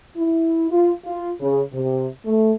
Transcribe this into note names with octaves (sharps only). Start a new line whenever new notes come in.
E4
F4
F4
C#3
C3
A3